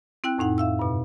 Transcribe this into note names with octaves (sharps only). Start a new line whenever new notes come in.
C4 E4 G5 F#6
F2 A2 D#4 F#5
E5 F5 E6
G2 B2